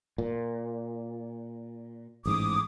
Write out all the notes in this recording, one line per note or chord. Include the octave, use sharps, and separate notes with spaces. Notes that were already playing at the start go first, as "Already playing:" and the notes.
A#2
A1 G#2 D6 D#6